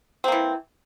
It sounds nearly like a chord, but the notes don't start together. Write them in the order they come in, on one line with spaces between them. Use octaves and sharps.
C4 A#3 E3